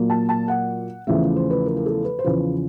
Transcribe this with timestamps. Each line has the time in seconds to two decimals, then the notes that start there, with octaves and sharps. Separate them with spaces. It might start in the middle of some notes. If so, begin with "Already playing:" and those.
Already playing: A#2 F#3 A#3
0.10 A5
0.29 A5
0.48 F#5
1.07 E2 C#3 F3 A3 E5
1.36 C5
1.51 B4
1.66 A#4
1.77 A#4
1.86 A4
2.05 B4
2.19 C5
2.24 E2 C#3 F3 B4